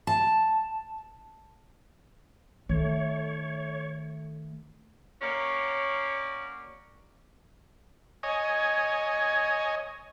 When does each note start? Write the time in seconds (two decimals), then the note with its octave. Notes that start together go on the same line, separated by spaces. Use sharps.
0.07 A5
2.69 D#3 A3 C#5
5.22 A#3 C#4 F#4 C#5 D5
8.23 C#5 D#5 G#5